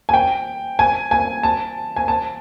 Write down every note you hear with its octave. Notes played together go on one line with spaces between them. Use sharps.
G#5
G5
G#5
G#5
A5
G#5
A5